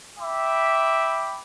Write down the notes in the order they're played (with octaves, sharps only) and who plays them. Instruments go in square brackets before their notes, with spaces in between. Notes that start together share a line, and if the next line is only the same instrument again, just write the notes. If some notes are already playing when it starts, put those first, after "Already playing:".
[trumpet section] E5 G5 B5 D6